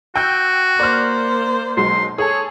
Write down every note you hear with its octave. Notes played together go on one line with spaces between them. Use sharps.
F#4 G5 E6 G6
A#3 C5 D5 F6
B1 F#3 G#3 C6
G#4 A4 C#5